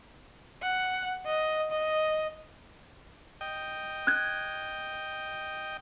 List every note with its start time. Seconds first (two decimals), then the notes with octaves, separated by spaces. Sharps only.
0.62 F#5
1.26 D#5
1.71 D#5
3.41 D#5 G5
4.07 F#6 G#6